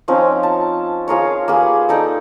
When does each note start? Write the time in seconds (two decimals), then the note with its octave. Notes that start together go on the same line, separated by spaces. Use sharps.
0.08 F3 C4 C#4 D#4
0.43 A5
1.08 F4 G#4 A#4 C#5
1.48 A#3 G4 G#4 B4
1.89 D#4 A4 D5